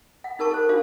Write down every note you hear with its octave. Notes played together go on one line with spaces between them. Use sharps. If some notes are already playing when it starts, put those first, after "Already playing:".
F#5
D#4 A#4 A5 C#6
A4 C5
D4 F#4 C5 F5